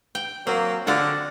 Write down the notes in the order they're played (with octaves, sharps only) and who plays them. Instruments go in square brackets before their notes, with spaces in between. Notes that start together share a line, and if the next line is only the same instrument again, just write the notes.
[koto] G5
[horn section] F#3 A#3 [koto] C4
[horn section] D3 [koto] F4 F#4 D5